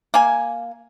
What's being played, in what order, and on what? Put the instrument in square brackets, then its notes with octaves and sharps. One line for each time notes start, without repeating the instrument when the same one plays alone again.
[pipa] A#3 G#5